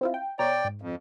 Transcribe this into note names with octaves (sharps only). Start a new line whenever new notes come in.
C4 E4 F4
G5
B2 C#5 D5 G5 A#5
G#2
F2